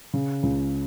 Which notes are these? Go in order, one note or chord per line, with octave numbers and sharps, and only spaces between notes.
C#3
C#2